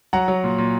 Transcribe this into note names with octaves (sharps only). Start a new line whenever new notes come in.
F#3 F#5 A#5
F#3
A#2
A#2